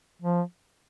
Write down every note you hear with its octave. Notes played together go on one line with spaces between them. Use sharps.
F3